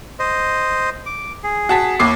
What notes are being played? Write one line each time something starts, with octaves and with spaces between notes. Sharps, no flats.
C5 D#5
D6
G#4
F#4 A5 B6
D#2 E4 D6 C7